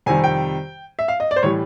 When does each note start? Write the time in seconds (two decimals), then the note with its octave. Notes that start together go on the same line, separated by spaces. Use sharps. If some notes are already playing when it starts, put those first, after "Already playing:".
0.06 F2 C3 D#3 G3 G#5
0.24 G5
0.99 E5
1.08 F5
1.20 D#5
1.31 D5
1.36 C5
1.43 A2 E3 G3 C#5